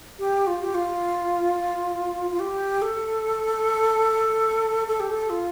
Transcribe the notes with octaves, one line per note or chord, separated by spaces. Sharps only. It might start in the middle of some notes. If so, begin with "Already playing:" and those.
G4
F4
G4
F4
F4
G4
A4
A4
G4
A4
F4